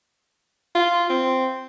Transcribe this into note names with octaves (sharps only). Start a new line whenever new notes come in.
F4
C4